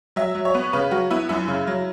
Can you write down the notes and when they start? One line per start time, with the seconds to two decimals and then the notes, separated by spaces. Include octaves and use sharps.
0.16 F#3 E5
0.35 F#3
0.45 C#5
0.55 B3
0.73 C#3 B4
0.91 F#3 F#4
1.10 B3 E4
1.29 F#2 E4
1.48 C#3
1.67 F#3